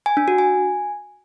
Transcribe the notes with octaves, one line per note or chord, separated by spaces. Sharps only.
G#5
D4
F#4
G#5